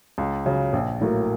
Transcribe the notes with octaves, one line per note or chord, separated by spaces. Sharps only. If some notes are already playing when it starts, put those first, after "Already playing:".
C#2
C#3 F#3
A#1
A2 F#3 A#3